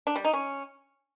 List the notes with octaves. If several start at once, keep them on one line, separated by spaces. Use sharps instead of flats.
D4
G3
D#4
C#4